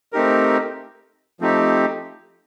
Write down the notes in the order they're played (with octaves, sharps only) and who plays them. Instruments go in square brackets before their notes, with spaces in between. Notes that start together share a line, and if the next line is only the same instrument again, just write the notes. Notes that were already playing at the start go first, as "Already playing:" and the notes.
[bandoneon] A3 C4 D#4 G4 A#4
F3 A3 C4 D#4 G4